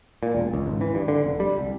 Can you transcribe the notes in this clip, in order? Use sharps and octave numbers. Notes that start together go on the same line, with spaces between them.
A#2
E1
C#2
G#1
E3
G2
D3
F1
G3
C2